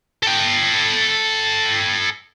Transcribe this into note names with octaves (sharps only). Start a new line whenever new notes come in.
A4 G5